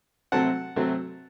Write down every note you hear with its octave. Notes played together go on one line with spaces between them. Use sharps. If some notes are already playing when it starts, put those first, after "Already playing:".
C3 F#3 A3 C4 F#5 A5
C3 F#3 A3 C4